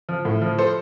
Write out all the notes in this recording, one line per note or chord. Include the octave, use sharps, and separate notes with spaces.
F3
A2
F3
A4 C5